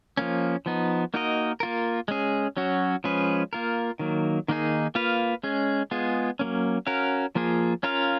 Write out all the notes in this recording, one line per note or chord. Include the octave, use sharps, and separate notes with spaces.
F3 A#3 C#4
F3 B3 D#4
A#3 D#4 F#4 A#4 D#5
A#3 F4 A#4
G#3 C#4 G#4
F#3 C#4 F#4
F3 G#3 C#4 G#4 B4
A#3 F4 A#4
D#3 F#3 A#3
D#3 A#3 D#4 G#4
A#3 F4 B4 F5
G#3 C#4 G#4
G#3 B3 F4 G#4
F#3 A#3 C#4
C#4 F#4 A#4 F5
F3 A#3 F4 G#4
C#4 F4 A#4 F5